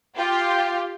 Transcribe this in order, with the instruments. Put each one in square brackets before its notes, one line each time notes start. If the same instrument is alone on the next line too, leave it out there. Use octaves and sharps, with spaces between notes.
[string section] F4 G4 [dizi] G5